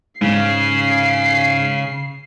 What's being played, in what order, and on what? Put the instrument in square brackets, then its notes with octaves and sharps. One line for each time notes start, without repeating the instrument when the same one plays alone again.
[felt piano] G#2 [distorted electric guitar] C#3 [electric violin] C7